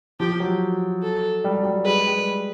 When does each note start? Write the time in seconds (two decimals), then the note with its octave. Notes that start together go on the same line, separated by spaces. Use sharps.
0.20 F3 G4
0.40 F#3
1.03 A4
1.44 G3
1.60 F#3
1.65 G3
1.85 G#3 B4
2.06 G3